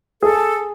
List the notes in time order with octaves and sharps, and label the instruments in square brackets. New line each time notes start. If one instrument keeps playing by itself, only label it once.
[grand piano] G#4 [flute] A4